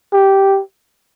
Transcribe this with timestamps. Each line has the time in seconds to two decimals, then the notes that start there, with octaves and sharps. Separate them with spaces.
0.13 G4